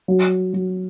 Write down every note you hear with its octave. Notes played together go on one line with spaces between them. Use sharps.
F#3
F#3